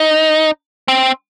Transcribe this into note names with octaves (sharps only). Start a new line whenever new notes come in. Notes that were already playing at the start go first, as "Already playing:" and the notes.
Already playing: D#4
C4